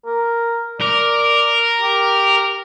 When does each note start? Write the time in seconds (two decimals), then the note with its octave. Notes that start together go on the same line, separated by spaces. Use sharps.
0.06 A#4
0.81 A#4 D5
1.80 G4